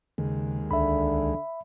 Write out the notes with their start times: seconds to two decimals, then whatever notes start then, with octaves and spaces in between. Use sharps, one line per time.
0.18 D#2 C#3 G#3
0.71 C#2 D3 E5 B5